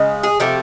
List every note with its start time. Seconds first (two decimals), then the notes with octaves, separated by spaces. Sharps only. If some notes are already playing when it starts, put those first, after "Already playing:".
Already playing: C#3 G#3
0.23 G#4
0.40 C3 F3 A3 G4